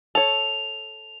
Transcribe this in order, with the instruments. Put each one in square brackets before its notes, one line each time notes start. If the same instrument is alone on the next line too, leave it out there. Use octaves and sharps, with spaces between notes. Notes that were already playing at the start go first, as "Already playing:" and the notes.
[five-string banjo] A4 C#5 [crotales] F7